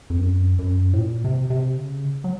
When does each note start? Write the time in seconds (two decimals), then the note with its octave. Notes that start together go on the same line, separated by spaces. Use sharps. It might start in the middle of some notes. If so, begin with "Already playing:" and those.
0.10 F2
0.19 F#2
0.59 F#2
0.93 A2
0.98 A#2
1.24 C3
1.50 C3
1.77 C#3
2.24 F#3